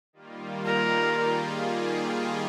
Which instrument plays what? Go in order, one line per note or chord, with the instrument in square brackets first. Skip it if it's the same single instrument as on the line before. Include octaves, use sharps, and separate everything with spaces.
[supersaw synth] D#3 G3 A#3 F4
[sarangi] A#4
[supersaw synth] D#3 G3 A#3 F4 G#4